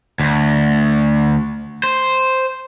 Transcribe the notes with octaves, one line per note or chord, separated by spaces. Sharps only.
D2
C5